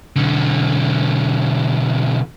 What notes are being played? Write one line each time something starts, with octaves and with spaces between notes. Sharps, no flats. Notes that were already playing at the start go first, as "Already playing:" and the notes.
B1 D3